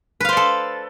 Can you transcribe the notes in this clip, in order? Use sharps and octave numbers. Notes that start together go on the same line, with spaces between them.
A4 B4 C5 D5 F5